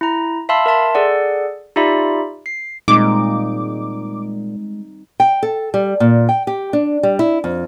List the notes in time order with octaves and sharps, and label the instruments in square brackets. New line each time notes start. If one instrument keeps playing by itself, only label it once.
[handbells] E4 A#5
E5 F5 A5 B5 C6 E6
A#4 E5 A5 C6
G#4 A4 D5 F#5
D#4 F4 G4 D5 E5 B5
C7
[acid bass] A#2 [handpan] G3 C4 D#4 [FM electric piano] G#3 [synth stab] D6
[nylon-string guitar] G5
A4
G3
A#2
G5
G4
D4
G3
E4
F2